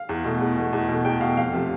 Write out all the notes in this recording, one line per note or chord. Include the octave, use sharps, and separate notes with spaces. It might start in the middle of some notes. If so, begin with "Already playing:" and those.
Already playing: F5
E2
B2 A3
E2
B2 A3
E2
B2 A3
E2 G5
B2 A3 F5
F2 F5
C3 F3 A3